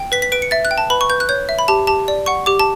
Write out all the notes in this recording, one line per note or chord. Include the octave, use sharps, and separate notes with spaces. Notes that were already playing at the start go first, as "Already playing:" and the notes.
Already playing: G5
B4 B6
B6
B4 D7
C#7
E5 A6
F#6
G5
A5
B4 B5
C#6
B4 G6
F#6
C#5 G6
E5
B5
G4 A5
G4 A5
D5
F#5 C#6
G4 D6
A5